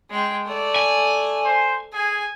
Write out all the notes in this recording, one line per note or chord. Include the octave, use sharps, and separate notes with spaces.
G#3 G5
A3 D5
G#5
C5
G#4 G#5